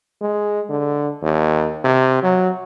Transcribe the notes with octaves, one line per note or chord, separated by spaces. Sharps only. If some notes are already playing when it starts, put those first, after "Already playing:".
G#3
D3
D#2
C3
F#3